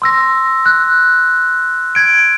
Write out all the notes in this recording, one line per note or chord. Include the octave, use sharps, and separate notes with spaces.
C6 E6 A#6
F#6
G#6 D7